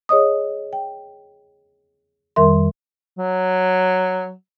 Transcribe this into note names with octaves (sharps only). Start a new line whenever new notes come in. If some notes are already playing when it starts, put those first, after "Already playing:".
G#4 C#5 D#5 D#6
G5
F2 D#3 G3 A#4 E5 C6
F#3